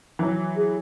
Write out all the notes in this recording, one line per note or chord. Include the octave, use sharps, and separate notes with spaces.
E3 F#3
G#4